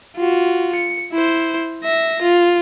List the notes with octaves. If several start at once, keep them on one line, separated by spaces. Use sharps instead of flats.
F4 F#4
C#7
E4 C5
E5 A#6
F4